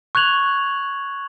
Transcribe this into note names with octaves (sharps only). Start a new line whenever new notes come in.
C#6 F#6 G#6 F7 F#7